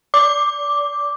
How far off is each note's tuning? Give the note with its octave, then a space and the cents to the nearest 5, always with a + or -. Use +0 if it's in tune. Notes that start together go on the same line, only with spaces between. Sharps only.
D5 -30 D6 +0